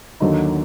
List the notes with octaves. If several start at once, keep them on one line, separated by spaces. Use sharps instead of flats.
D#2 D3 F#3 A#3 D#4